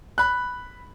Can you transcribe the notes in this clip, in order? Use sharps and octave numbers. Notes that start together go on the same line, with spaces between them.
B5 F#6